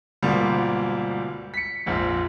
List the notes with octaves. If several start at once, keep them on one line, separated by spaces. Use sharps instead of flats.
D2 G#2 B2 F3 G3 A#3
B6 C#7
A#1 F2 G#2